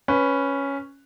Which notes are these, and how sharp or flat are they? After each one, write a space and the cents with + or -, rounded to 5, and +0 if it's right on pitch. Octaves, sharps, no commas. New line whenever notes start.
C#4 +0 B4 +0